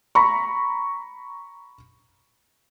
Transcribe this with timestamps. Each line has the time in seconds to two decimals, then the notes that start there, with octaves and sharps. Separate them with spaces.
0.15 A#5 B5 C#6